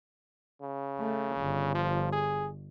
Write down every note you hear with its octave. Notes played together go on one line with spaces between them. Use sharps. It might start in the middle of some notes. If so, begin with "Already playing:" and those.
C#3
A3
G1
F3
G#4